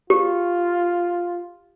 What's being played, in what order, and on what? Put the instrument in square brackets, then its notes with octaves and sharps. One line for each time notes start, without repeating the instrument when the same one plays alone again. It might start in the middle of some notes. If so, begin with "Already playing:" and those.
[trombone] F4 [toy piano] G4